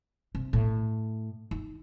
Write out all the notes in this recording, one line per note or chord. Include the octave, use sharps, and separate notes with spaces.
C3
A2
D#4